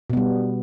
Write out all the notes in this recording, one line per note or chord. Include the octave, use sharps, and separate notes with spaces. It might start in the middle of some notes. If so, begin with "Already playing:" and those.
B2 G3 B3